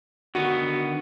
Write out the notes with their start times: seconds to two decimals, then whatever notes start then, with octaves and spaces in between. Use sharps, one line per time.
0.35 D3 D#3 B3 F#4